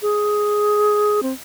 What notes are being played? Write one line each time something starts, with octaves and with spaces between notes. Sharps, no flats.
G#4
C4